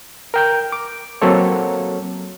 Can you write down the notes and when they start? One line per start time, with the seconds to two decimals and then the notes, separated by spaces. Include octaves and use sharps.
0.34 A#4 G5 G6
0.72 D6
1.22 F#3 A#3 C4 A4 C#5